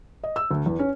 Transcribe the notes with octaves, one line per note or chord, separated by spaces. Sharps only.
D#5
E6
D2
E2
C#4